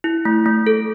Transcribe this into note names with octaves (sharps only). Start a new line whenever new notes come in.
E4
A3
A3
A4